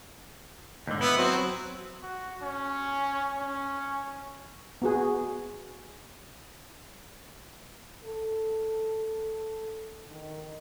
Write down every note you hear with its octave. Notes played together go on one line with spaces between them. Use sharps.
D#2 G#2 D3
B3 E4
F#3 C4
F#4
C#4
C#4
B3 F#4 G#4
A4
D#3